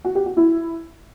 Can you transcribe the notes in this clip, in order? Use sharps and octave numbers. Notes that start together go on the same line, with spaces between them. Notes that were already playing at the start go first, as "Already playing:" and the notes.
F#4
G4
F#4
E4